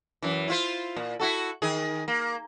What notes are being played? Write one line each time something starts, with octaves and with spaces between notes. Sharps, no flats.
F#2 E3
E4 F4 C5
A#2
E4 F#4 A4
D#3 G#4
A#3